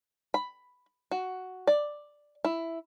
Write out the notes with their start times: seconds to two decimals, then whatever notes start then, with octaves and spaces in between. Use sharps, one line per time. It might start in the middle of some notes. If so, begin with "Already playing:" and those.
0.34 B5
1.11 F#4
1.67 D5
2.45 E4